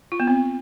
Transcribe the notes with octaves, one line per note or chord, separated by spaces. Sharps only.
F4
B3
C4